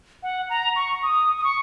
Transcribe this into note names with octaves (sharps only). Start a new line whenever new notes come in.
F#5
A#5
C#6
D#6
D#6
C#6